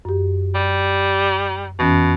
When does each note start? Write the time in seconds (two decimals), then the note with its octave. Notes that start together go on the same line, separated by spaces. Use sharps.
0.05 F#2 G4
0.55 G3
1.79 F2 B2 E3 C#4